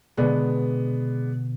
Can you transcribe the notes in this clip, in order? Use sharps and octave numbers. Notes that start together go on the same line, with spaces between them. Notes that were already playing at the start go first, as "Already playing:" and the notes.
B2 D3 G#3 B3 D5